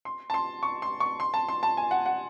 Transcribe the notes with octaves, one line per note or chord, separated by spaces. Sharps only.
C6
A5
C6
C#6
C6
C#6
C6
A5
C6
A5
G#5
F#5
F#5